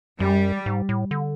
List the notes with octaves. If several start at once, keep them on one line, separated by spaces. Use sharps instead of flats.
F#2 G3
G#2
A2
D3